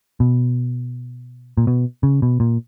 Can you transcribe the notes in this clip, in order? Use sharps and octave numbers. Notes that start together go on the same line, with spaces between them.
B2
A#2
B2
C#3
B2
A#2